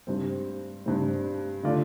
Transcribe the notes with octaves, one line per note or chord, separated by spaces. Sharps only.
G2 G3 C4
G2 G3 C4
D3 A3 F4 D5